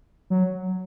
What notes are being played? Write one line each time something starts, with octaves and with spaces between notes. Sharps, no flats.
F#3